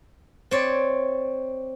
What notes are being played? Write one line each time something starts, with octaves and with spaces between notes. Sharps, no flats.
C4 C#5 D5